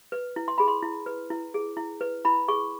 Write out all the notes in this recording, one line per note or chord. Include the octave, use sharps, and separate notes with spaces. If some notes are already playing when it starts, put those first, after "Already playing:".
B4
E4
C6
G#4 B5
C6
E4
B4
E4
G#4
E4
B4
E4 B5
G#4 C#6